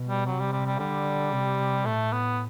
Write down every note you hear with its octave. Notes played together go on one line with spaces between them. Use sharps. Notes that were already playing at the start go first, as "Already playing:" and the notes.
Already playing: B2
G3
C3 F#3
G3
G3
G3
D3 G3
C3
A2 A3
B3